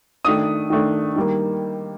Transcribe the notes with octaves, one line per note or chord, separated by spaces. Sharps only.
D#3 A3 D4 D#6
D#3 A3 D4
D#3 G3 A#3